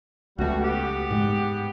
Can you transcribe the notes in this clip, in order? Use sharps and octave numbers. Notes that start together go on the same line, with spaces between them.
C#2 B2 G3 A3 F#4
G3 B3 G4
G#2 G#3